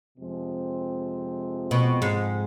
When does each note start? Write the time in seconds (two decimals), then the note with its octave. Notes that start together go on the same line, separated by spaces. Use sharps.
0.17 F2 C3 F3 G#3 C4
1.71 B2
2.02 G#2